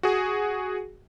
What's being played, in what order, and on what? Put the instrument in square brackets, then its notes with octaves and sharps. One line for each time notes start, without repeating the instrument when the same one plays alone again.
[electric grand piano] F#4 G#4